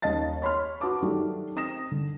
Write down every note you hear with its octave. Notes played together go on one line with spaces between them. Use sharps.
D#2 C#4 D#5 A5 A6
C#5 B5 C6 F6
F#4 B4 A5 D6 D#6
D#3 F#3 A3 D4 G4
C4 D#6 A#6 E7
D3